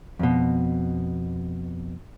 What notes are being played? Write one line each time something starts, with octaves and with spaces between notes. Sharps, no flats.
F2 B2